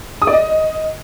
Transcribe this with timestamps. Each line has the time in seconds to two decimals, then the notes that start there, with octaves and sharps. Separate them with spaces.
0.22 D#6
0.27 D5
0.33 D#5